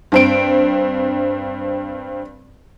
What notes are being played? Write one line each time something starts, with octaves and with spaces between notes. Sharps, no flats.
G2 C4 D7